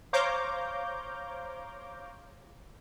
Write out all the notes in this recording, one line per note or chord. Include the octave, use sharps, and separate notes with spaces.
C5 C#5 F5 A#5 D6 G6